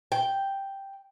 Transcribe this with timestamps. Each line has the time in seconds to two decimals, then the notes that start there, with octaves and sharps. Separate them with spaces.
0.12 G5